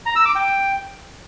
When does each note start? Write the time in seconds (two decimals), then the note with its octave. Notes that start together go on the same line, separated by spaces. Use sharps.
0.06 A#5
0.16 E6
0.25 D6
0.35 G5